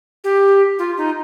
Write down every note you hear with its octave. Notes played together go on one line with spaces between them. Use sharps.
G4
F4
D#4